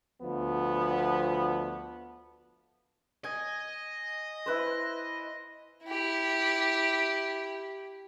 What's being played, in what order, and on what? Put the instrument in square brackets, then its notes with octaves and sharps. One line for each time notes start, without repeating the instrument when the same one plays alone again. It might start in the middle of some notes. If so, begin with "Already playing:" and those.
[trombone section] D2 F3 B3
[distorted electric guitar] D#5 [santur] G#5
[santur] E4 B4 C5
[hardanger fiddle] E4 G4